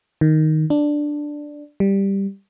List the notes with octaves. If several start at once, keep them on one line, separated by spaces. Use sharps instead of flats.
D#3
D4
G3